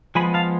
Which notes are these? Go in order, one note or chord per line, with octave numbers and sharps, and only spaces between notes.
F3 G#3 B3 G#5 B5
F5 A5